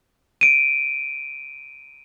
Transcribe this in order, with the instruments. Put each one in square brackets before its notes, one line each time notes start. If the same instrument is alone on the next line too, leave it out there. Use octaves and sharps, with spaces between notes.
[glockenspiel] D7 D#7